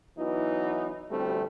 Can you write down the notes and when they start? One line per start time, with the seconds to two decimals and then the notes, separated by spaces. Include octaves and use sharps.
0.17 E3 F#3 B3 D#4 E4
1.10 A1 D2 G3 A3 C4